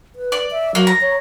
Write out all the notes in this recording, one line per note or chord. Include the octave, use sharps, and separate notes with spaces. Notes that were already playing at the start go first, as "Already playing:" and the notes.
B4
D5
E5
F#3 A#3
A#5
C#5